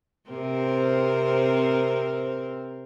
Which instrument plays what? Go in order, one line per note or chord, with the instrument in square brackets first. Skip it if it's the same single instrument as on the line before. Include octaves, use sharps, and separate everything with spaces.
[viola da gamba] C3 C4 A#4